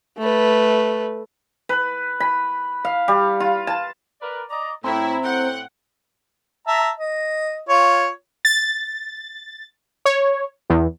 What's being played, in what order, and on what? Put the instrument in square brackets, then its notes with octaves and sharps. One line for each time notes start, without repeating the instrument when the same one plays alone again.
[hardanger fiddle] A3 B4
[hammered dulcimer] B4
B5
F5
G3
F4
A5
[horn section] A#4 B4 D5
[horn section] D5 D#5 A#5 [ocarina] D6
[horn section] A2 [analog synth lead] C4 [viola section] E4 [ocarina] A#5
[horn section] A2 G5 [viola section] F#5
[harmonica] E5 A5 A#5
D#5
F4 C#5
[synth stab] A6
C#5
E2